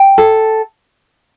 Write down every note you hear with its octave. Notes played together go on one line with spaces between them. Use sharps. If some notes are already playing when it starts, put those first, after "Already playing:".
Already playing: G5
A4